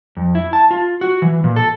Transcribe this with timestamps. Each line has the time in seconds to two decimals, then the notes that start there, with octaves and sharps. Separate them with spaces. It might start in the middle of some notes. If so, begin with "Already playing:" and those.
0.17 F2
0.35 E4
0.53 A5
0.71 F4
1.01 F#4
1.22 E3
1.44 A#2
1.56 A4